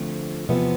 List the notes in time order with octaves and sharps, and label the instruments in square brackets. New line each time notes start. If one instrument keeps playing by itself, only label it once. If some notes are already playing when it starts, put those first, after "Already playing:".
Already playing: [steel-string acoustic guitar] D3 F3 A3 C4
E2 C3 F3 B3